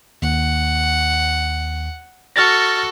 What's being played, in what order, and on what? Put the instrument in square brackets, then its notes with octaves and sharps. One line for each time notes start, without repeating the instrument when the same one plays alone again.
[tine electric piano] D#2 [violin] F#5
[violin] F#4 A4 [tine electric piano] F6 A6 A#6